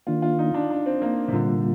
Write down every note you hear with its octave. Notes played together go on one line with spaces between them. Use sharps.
D#3 A#3 D4 F4
F4
D#4
D4
D4
C4
A#3
C3
A#2 D3 G3 A#3 F4